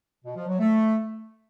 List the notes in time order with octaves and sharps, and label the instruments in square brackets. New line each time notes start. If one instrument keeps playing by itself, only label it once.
[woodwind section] B2
F3
F#3
A3